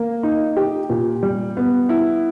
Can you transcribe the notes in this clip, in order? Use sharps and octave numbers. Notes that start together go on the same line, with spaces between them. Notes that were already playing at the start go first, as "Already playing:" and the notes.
Already playing: A#3
D#4
G4
A#2
G3
B3
E4